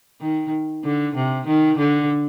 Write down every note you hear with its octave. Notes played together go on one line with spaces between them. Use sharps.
D#3
D3
C3
D#3
D3